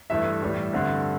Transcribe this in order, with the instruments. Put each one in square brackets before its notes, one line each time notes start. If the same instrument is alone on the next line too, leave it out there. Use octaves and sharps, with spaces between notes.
[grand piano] G2 E3 A3 E5
A2 E3 G3
G2 D3 A3 C4